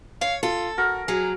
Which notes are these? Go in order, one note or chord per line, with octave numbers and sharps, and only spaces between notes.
C#5 F5
F4 A4
F#4 A#4
F#3 G#4